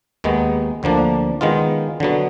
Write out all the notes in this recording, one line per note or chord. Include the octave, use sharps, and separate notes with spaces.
D#2 D#3 G#3 B3
D2 D3 F3 A#3 D4
D#3 G#3 B3 F4
D3 F#3 B3